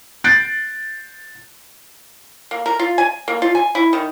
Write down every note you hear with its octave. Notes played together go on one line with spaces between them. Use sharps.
F#6 G6 A6 C7 D7
A#3
A#4
F4
G#5
A#3
F4
G#5
E4
D#3